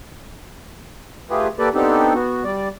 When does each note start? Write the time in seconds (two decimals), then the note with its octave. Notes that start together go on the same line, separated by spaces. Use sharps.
1.30 A3 F4 G4 G#4 B4
1.59 A#3 G4 A4 B4 D5
1.74 B3 C4 D4 D#4 G4 A4
2.14 B3 F#4
2.44 G3 D5